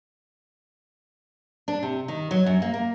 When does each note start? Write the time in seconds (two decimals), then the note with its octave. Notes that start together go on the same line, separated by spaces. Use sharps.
1.68 D4
1.83 C3
2.08 D#3
2.31 F#3
2.46 F#2
2.62 A#3
2.74 A#3